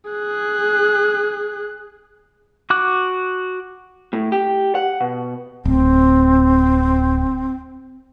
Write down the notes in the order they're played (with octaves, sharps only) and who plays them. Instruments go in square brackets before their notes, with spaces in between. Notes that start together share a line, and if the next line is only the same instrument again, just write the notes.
[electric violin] G#4 F#6
[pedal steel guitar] F#4 D6 F#6
[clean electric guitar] A2
G4
F#5
B2
[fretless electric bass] D1 [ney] C4